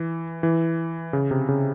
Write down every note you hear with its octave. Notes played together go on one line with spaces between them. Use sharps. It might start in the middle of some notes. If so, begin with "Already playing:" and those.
Already playing: E3
E3
C#3
C3
C#3